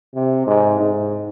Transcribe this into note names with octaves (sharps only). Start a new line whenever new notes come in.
C3
G#2
G#2